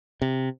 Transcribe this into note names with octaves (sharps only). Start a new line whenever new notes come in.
C3